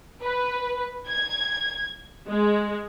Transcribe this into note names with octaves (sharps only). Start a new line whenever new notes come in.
B4
G#6
G#3